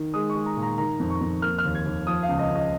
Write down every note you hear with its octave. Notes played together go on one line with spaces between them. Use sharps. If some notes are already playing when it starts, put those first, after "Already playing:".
Already playing: D#3
G#3 D#6
C#6
G#3
A#5
A#2
A#5
D#3 A#5
F2
C#6
F2
A#3 F6
F6
D#2
G#6
D#2
F3 D#6
F5
C#2
D#5
C#2
D#5